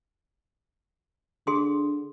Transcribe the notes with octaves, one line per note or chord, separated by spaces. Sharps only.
D3 G#4 C6 D#6